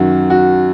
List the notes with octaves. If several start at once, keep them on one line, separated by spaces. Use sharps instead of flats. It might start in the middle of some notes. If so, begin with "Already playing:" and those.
Already playing: F#2 D#3 F#4
F#4